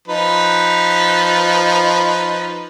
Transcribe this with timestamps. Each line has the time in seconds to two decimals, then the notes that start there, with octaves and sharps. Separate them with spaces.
0.08 F3 D#4 B4